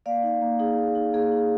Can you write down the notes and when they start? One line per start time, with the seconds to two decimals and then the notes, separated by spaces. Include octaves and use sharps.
0.06 A#3 D5 F5
0.23 D#4
0.42 A#3
0.59 D#4 G#4
0.77 A#3
0.95 D#4
1.13 A#3 G#4
1.32 D#4